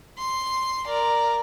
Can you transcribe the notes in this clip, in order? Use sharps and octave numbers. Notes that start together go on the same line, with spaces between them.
C6
A#4 D5